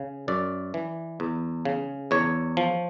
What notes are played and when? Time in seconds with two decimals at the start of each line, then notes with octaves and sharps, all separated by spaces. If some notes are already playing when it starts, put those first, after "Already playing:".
Already playing: C#3
0.28 F#2 D5
0.74 E3
1.20 E2
1.65 C#3
2.11 E2 C#5
2.57 F3